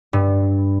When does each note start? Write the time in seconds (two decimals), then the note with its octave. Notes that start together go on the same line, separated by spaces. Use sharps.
0.13 G2